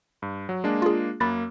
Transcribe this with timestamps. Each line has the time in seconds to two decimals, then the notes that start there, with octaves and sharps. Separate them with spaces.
0.22 G2
0.49 F#3
0.64 G#3 A#3 D4
0.82 F4 G#4
1.20 F#2 A#3 B5 F#6 A6